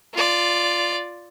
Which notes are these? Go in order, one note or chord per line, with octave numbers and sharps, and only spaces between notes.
F4 D5